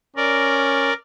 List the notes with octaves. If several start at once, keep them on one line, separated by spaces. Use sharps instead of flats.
C#4 A#4 D5